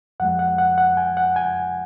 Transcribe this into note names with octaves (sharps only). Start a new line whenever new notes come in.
F2 F3 G#3 F#5
F#5
F#5
F#5
G#5
F#5
G#5